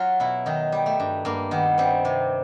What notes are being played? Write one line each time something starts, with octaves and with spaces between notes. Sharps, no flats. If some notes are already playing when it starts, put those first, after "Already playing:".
Already playing: F#3 F4
B2 E4
D#3 D#4
G3
A3
G2
G2 A#3
D#3 B3
G3 C4
C3